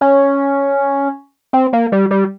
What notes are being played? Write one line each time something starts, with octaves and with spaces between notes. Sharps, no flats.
C#4
C4
A#3
G3
G3